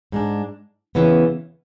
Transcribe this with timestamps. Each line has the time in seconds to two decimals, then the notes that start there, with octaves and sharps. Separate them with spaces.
0.12 G#2 G#3 D4
0.95 E2 C#3 E3 B3